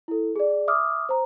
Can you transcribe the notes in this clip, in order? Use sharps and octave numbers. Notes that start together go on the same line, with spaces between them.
E4 A4
G#4 D5
E5 D6 D#6 F6
C5 A#5